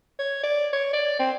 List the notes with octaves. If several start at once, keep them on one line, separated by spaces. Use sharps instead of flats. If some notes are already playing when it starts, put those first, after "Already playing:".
C#5
D5
C#5
D5
C4